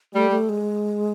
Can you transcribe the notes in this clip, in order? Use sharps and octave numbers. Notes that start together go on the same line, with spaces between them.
G3 A3
A3
G#3